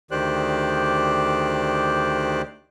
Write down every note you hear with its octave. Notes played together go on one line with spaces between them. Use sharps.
D2 D#3 G4 C5 D5 F#6